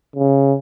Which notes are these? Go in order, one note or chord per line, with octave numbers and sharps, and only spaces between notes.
C#3